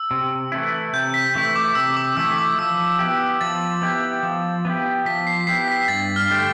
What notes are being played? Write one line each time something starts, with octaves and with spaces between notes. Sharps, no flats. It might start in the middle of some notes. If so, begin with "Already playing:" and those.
Already playing: E6
C3
E3 A3 E4
C3 G6
B6
E3 A3 E4 B6
D6
C3 E6
D6
E3 A3 E4 E6
D6
F3 E6
B3 E4 G4
F3 A6
B3 E4 G4
F3
B3 E4 G4
F3 B6
C7
B3 E4 G4 C7
B6
G2 A6
F6
D3 A3 D4 G4